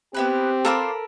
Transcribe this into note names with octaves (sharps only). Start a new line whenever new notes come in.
B3 C4 E4 G4 B4
F4 A4 A#4 C5 B5 D6